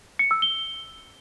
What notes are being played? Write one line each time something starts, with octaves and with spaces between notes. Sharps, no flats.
C#7
E6
G7